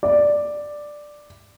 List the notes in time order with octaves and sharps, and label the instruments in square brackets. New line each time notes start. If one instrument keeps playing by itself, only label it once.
[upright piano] D5